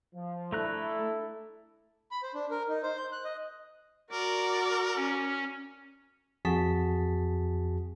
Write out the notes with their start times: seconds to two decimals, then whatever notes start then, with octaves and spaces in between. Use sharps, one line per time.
0.15 F3
0.52 A3 D4 E4 A4 A#5 F#6
2.11 B5
2.23 C5
2.34 D4
2.51 A#4
2.69 D#4
2.83 C5
2.97 G6
3.12 F#6
3.25 D#5
4.11 F#4 A#4 D5
4.96 C#4
6.45 F2 F#4 G#4 A5 B6